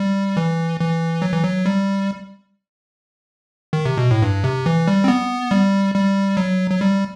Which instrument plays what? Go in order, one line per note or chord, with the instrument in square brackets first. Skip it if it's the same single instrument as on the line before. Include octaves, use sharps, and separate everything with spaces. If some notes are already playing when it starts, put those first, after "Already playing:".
Already playing: [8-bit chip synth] G3
E3
E3
F#3
E3
F#3
G3
D#3
C3
B2
A2
G2
C3
E3
G3
C4
B3
G3
G3
F#3
F#3
G3